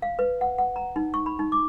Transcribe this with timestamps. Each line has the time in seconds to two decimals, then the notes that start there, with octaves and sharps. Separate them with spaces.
0.02 F5
0.19 B4
0.41 F#5
0.58 F#5
0.76 A#5
0.96 D#4
1.14 C#6
1.26 B5
1.39 D#4
1.52 D6